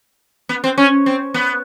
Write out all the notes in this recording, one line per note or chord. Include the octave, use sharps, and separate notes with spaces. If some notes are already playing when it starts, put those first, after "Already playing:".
B3
C4
C#4
C4
B3